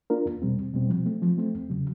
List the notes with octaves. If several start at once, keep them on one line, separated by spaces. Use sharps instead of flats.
A#3 D4 F4 A#4
E2
B2 G3 C4
E2
B2 G3 C4
F3
A3 C4
F3
A3 C4
E2
C#3 F#3